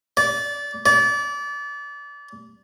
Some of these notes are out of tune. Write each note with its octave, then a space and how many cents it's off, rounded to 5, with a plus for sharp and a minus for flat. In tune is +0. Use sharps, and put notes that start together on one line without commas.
D5 -25
D5 -30